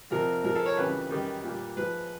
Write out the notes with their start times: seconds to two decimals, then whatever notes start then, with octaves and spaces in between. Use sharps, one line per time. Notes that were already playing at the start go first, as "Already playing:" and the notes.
0.11 F2 C3 F3 A#4
0.44 G#2 F3 A#4
0.55 A4
0.66 C#5
0.77 F2 C#3 E3 G3 B4
1.11 F#2 D#3 G3
1.43 A#2 G3
1.76 G#2 F3 B4